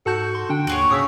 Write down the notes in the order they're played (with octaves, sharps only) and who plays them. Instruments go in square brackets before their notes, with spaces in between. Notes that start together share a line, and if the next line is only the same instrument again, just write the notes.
[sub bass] G#2 [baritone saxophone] F#4 [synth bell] A4 A5 G6
[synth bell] C6
[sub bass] D3 [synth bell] D4 G5
[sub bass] D#2 [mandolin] F#4 G#4 C#5
[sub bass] A2 [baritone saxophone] C#3 [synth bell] D#6 E6 B6